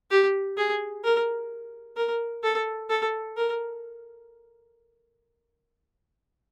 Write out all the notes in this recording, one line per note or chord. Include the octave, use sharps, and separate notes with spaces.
G4
G#4
A#4
A#4
A4
A4
A#4